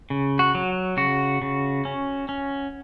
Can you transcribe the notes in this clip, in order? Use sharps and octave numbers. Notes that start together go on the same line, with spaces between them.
C#3
F#4
F#3
C#3 F#4
C#3
C#4
C#4